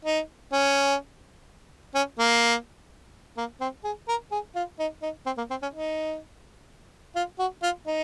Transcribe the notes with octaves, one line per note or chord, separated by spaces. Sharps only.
D#4
C#4
C#4
A#3
A#3
C4
G#4
A#4
G#4
F4
D#4
D#4
C4
A#3
C4
C#4
D#4
F4
F#4
F4
D#4